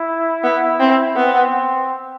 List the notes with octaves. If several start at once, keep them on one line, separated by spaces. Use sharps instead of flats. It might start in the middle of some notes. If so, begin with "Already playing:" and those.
Already playing: E4
B3
C4
B3 C4